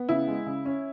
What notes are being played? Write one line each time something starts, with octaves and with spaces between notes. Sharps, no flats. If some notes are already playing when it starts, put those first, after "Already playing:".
Already playing: B3
C#3 E4
G#3
C#3
C#4